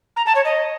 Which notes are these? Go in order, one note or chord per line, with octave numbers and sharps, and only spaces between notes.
A#5
A5
C#5
D#5